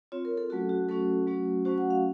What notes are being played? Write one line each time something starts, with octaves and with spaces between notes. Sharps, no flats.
C4 F4 C#5
A#4
A4
F#3 A3 C#4 F#4 A4
F#4
F#3 A3 C#4 F#4 A4
F#3 A3 C#4 F#4
F#3 A3 C#4 F#4 C5
F#5
F5